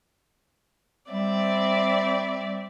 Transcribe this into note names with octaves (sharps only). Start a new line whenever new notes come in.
G3 C4 D5 E5